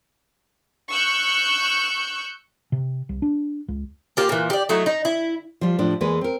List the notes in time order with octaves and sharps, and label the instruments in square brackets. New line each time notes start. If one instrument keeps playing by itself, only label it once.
[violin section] C#6 E6 F#6 G6
[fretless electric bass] C3
C2
D4
C#2
[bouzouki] A#3 F4 G4
A#2 E3
G4 D5
F#3 A3 D#4 E4
D#4
E4
[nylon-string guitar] F3 G3 F4
A2 F3 D4
E2 E3 G#3 A#3 G#4 B4
C4 A#4